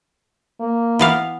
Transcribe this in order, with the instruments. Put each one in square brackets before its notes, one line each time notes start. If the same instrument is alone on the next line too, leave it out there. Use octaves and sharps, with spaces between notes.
[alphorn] A#3
[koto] E3 B3 F5